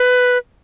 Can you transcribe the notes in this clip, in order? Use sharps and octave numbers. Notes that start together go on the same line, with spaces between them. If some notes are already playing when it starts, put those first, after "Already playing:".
Already playing: B4